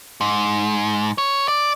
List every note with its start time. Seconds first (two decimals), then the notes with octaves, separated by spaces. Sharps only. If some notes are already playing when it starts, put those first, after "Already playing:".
0.21 G#2
1.18 C#5
1.48 D5